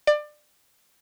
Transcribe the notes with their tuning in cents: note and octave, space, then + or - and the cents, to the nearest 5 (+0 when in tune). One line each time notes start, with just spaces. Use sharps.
D5 +25